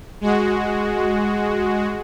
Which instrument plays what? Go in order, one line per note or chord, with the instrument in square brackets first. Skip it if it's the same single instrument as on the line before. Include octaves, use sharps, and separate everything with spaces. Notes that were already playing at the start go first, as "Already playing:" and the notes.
[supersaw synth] G#3 F#4